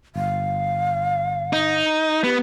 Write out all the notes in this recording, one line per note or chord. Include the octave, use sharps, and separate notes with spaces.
G1 F5
D#4
B3 G4